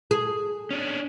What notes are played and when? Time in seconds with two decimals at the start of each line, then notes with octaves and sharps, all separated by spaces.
0.11 G#4
0.71 C#4 D4